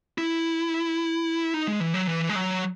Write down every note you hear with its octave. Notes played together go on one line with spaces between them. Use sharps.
E4
D#4
G#3
E3
F#3
E3
G#3
F#3